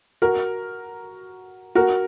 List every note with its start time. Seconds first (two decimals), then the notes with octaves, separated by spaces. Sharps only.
0.22 F#4 A#4
1.75 F#4 A#4